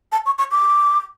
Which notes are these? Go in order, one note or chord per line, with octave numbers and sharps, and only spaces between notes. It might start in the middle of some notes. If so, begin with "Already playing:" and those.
A5
C#6
C#6
D6